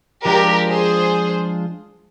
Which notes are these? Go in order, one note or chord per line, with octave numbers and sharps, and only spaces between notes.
F3 G#3 D4 F4 G4 A#4
G#4 C5